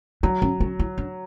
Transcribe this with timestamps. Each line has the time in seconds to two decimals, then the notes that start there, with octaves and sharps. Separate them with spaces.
0.23 F#3 D4
0.42 C#4
0.60 C#4
0.79 E4
0.98 D4